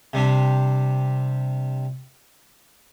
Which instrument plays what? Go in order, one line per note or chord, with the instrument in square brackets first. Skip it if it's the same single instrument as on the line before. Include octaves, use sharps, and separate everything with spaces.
[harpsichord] C3 G3 C4 D4